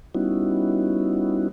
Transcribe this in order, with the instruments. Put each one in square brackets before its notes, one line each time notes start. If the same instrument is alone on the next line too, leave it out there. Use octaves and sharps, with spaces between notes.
[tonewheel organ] G3 B3 C#4 D#4 E4 F#4